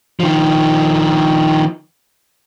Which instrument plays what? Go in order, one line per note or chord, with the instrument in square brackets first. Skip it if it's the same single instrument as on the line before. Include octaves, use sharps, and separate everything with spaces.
[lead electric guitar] D#3 F3